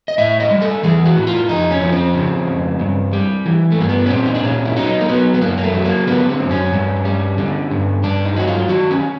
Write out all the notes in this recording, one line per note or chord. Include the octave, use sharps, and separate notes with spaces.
D#5
A2 E5
D#5
G3
A4
E3 G#4
F#4
A2
F4
F2 D#4
C#4
F3
C4
C#3
F2
G2
G3
E3
A3
G2 A#3
B3
C#4
A#2 C4
D#4
D4
A#2 C#4
E4
F#3 D#4
A#3
F#3 B3
B3
F#2 A#3
A#3
A3
F#3
A#3
D3 B3
C4
F#2
C#4
G2
G3
D3
G2
G2 D4
D#4
F#3 F#4
F4
D#3 F#4
C#4